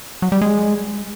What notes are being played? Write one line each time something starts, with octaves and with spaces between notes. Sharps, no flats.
F#3
G3
G#3